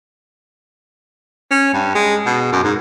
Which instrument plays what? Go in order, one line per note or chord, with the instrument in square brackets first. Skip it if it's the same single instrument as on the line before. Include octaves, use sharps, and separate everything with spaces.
[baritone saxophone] C#4
G2
G#3
B2
F#2
G#2